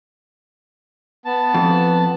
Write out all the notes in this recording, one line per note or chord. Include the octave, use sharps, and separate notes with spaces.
B3 A5
F2